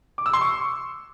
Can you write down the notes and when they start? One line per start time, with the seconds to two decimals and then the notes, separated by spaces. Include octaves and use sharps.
0.18 D6
0.26 E6
0.33 C6
0.41 C#6